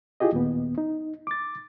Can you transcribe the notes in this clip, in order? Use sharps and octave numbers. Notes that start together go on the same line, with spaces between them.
E4 F4 G4 G#4 D#5
D#2 A#2 B3
D#4
D6 A6